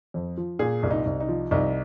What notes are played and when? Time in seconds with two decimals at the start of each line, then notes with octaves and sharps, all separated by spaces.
0.14 F2
0.37 F3
0.59 A#2 G#4
0.83 C2
0.91 D#4
1.06 C2
1.20 D#4
1.28 F3
1.51 C2 D#4